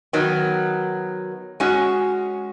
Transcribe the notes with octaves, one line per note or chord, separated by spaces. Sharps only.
D#3 F#3 B3
G#3 C#4 F#4